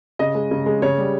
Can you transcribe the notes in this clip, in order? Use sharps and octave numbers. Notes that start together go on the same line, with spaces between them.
C#3 D#5
G#3
C#3
G#3
C#3 C#5
G3